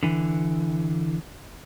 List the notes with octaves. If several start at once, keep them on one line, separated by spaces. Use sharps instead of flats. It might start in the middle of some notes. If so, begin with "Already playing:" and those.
D3 E3